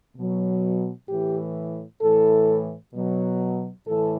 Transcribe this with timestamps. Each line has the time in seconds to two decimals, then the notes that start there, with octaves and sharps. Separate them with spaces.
0.16 B2 F#3
1.09 A2 E3 G4
2.01 A2 E3 A4
2.94 B2 F#3
3.87 A2 E3 A4